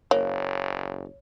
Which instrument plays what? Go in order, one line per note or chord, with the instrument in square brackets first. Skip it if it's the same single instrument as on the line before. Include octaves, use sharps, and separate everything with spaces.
[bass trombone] F#1 [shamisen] A#3 [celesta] C#5